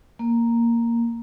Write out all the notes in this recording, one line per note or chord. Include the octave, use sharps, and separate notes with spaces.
A#3